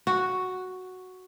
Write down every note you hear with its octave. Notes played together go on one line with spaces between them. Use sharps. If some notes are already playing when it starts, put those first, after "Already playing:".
F#4